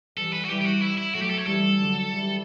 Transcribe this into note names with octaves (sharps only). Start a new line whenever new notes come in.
E3 G3 A4
B4
F#4
E3 G3 G4
G4
F#4
E4
E4
F#3 A3 F#4
G4
A4
C#5
E3 G3 A4
D3 F#3
E3 G3